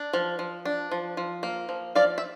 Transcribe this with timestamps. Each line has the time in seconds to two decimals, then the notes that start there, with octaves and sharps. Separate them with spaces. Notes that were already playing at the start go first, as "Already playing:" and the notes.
Already playing: D4
0.13 F3
0.39 F3
0.65 D4
0.91 F3
1.17 F3
1.43 A#3
1.69 F3
1.95 F3 D5 F5
2.18 E5